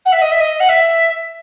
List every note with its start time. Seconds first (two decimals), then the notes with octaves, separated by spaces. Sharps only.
0.05 F#5
0.12 E5
0.21 D#5
0.31 E5
0.40 D#5
0.60 F#5
0.69 E5